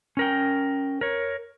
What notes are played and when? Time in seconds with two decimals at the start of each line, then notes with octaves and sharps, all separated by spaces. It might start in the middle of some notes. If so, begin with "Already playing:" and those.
0.17 C#4 A#4 G5
1.01 A#4 C#5